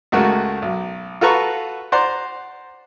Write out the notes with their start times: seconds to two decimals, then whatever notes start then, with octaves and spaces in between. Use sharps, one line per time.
0.12 C#2 G#3 A3 F#4 A#4
0.62 B1
1.21 F4 F#4 A4 B4 A#5 C#6
1.92 C5 D5 F#5 A#5 C6